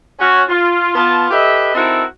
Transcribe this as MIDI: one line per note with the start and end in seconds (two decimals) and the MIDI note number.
0.20 0.43 61
0.20 0.43 66
0.48 0.91 65
0.95 1.26 59
0.95 1.26 65
0.95 1.26 81
1.31 1.72 67
1.31 1.72 69
1.31 1.72 71
1.31 1.72 75
1.31 1.72 76
1.75 2.04 60
1.75 2.04 63
1.75 2.04 64
1.75 2.04 66
1.75 2.04 69
1.75 2.04 70